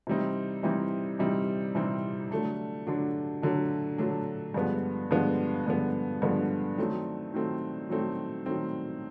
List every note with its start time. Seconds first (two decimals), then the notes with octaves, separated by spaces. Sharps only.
0.07 C3 E3 G3 C4 D#4
0.63 C3 E3 G3 C4 D#4
1.19 C3 E3 G3 C4 D#4
1.75 C3 E3 G3 C4 D#4
2.31 D3 F#3 A3 D4
2.87 D3 F#3 A3 D4
3.42 D3 F#3 A3 D4
3.98 D3 F#3 A3 D4
4.54 G2 D3 F3 G#3 B3
5.11 G2 D3 F3 G#3 B3
5.66 G2 D3 F3 G#3 B3
6.22 G2 D3 F3 G#3 B3
6.78 D#3 F#3 A3 C4
7.34 D#3 F#3 A3 C4
7.89 D#3 F#3 A3 C4
8.46 D#3 F#3 A3 C4